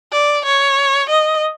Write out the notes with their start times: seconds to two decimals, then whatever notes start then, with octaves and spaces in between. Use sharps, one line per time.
0.12 D5
0.46 C#5
1.09 D#5